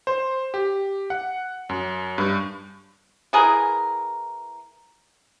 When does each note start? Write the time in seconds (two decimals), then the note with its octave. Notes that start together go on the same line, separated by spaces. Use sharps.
0.07 C5
0.54 G4
1.10 F#5
1.69 F#2
2.18 G2
3.33 E3 G#4 A#4